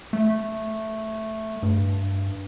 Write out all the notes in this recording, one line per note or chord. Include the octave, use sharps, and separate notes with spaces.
A3
G2